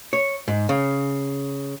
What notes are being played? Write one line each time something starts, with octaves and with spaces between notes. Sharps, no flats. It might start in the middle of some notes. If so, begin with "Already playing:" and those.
C#5
G#2
C#3